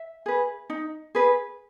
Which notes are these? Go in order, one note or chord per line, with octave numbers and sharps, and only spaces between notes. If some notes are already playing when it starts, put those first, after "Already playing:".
Already playing: E5
G#4 B4
D#4
G#4 B4